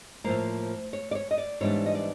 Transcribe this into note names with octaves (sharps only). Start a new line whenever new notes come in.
A2 F3 A#3 C5
C#5
D5
C#5
D#5
D5
G#2 E3 G3 B3 D4 C#5
D#5
D5